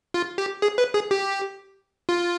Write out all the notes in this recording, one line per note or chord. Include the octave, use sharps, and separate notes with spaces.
F4
G4
G#4
B4
G#4
G4
F4